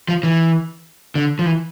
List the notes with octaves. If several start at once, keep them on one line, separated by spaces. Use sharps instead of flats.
F3
E3
D3
F3
E3